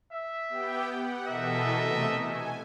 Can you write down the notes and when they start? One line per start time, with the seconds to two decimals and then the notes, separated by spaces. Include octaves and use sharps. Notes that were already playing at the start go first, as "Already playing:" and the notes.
0.13 E5
0.49 B3 G4 G5
0.91 F#5
1.27 B2 E3 A4 A#4 D#5 E5
1.79 C3 A3
2.20 G#5